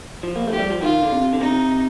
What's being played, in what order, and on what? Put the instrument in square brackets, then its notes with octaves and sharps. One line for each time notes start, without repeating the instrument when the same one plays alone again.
[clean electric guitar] F3
A#3
A3
[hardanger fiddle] G4
[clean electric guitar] G3
F3
[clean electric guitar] D#3 [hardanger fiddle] F4
[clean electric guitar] D3
C3
D3
[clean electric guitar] C3 [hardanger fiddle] D#4